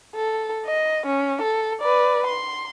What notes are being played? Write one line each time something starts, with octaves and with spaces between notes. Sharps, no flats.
A4
D#5
C#4
A4
B4 D5
C6